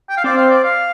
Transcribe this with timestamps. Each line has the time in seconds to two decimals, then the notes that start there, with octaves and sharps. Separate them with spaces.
0.09 G5
0.17 F5
0.24 C4 D5
0.37 F5
0.50 D5
0.64 F5